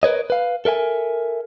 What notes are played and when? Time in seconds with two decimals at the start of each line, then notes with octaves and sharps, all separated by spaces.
0.03 A#4 B4 C#5 D#5
0.30 B4 F5
0.65 A4 A#4 E5 G#5